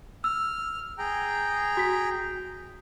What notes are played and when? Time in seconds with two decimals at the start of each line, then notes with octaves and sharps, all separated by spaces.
0.24 E6 F6
0.98 G#4 G5 A#5
1.77 F#4 B6